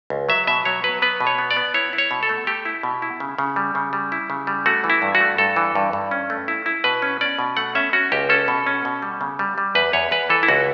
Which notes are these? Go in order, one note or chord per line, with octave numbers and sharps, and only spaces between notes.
C#2
F#3 E5
B2 E5
F#3 C#5
F#3 B4
B3 B4
B2
C#5
B3
D5
B3
E4 C#5
E4
C#5
B2
A4
A3
A3 G4
E4
B2
E4
C#3
C#3
G3
C#3
G3
E4
C#3
G3
A3 F#4
E3
E4
G2
F#4
A3
G2 A4
E3
G2
G2
C#4
A3
E4
E4
B2 B4
C#4
C#4 D5
B2
A3 F#5
C#4 E5
C#4 F#4
C#2 G4
C#4 A4
B2
C#4
B2
G3
C#3
G3
G3
E2 B4
E2 C#5
E2 B4
E3 A4
E4
C#2 F#4